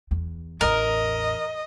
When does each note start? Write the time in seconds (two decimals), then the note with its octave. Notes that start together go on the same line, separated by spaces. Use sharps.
0.11 E2
0.61 A1 E2 A#4 D#5